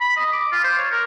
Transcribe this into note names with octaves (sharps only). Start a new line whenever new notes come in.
B5
D#5
D6
F4
C5
C#5
A#4